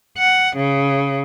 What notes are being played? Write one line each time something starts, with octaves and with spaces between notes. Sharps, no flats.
F#5
C#3